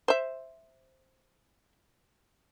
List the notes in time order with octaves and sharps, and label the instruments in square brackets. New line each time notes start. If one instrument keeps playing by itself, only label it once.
[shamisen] C5 E5